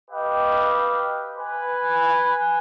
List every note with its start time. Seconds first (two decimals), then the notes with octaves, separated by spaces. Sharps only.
0.11 G4 B4 D#5 F5 G5
1.38 B4 G#5